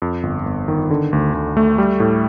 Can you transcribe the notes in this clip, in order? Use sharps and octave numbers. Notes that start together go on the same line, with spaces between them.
F2
G1
G1
D#3
D3
D2
D2
A3
G3
A2